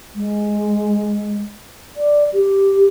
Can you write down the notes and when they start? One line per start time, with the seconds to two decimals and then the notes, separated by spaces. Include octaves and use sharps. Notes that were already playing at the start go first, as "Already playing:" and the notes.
0.15 G#3
1.96 D5
2.33 G4